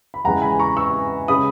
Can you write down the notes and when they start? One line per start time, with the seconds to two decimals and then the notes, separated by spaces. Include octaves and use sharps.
0.14 B5
0.24 E2 C#3 E3 G#3 F#5 A#5
0.42 G#5 B5
0.59 A#5 C#6
0.77 C#6 E6
1.28 C#3 G#3 B5 D#6